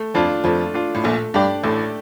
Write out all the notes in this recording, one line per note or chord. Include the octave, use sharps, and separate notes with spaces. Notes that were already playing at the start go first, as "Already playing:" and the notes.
Already playing: A3
F2 F3 D4 F4
F2 F3 A3
D4 F4
A2
A#1 A#2 A3
G2 D4 G4 D5
A1 A2 A3